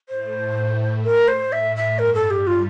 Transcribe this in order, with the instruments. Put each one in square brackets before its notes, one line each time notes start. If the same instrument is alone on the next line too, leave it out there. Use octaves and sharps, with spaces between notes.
[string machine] A2 A3 [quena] C5
[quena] A#4
C5
[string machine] A2 A3 [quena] E5
[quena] E5
[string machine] G2 G3 [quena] A#4
[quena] A4
G4
F4